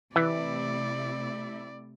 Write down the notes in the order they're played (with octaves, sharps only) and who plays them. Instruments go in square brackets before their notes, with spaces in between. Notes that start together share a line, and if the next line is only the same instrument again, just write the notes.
[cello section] C3 A3 E4 [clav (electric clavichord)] E3 [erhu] D5